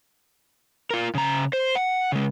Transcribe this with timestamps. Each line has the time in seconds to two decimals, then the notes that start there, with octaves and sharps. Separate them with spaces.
0.91 F4 A#4
1.15 C#3 A#5
1.53 C5
1.76 F#5
2.12 C#3 G#3